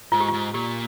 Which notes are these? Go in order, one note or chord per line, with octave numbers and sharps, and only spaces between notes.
G#2 F4
G4
G#2 F4
A#2 G4